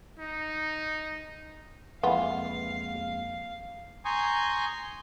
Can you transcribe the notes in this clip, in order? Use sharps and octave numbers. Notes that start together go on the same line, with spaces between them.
D#4
F2 E3 G#3 A#3 B3 F4 F5
G#5 A#5 C6 C#6 D#6 G6